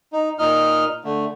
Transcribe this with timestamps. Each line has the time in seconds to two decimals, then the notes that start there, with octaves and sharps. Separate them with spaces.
0.13 D#4
0.39 A#2 D#4 D#5 F6
1.04 D3 A3